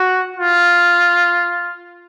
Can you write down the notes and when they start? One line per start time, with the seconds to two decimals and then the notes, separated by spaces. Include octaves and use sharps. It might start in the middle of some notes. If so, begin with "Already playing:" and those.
Already playing: F#4
0.37 F4